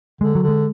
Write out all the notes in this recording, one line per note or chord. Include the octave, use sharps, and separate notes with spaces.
D3 G#3
F#3
D3
G#3